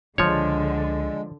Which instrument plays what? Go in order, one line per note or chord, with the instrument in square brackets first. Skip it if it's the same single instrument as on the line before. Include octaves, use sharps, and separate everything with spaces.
[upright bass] C#2 [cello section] D3 [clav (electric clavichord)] F3 C#5 [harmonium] G#3